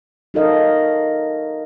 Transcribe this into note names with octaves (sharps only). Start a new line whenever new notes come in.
D#4 F#4 A4 A#4 D#5 F5